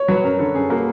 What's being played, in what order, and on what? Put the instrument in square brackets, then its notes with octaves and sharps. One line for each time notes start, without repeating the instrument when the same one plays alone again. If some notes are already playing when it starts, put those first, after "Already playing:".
Already playing: [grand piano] C#5
[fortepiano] F#3 [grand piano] B4
[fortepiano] F#2 [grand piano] A#4
[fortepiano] D3 [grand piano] A4
[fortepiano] F#2 [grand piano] G#4
[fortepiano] A#3 [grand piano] F#4